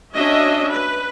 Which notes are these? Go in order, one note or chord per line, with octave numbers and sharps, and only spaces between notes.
C#4 D4 F#4 D#5 E5
B4